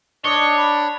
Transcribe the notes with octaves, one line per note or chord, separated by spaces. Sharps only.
D4 C#5 D#5 D6 C#7 G7
B5